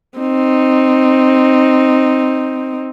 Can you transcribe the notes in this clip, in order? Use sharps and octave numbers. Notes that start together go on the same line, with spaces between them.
C4 D#4